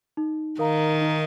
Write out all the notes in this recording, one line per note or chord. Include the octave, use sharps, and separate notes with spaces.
D#4
D#3 A#4 F5 A#5
D#4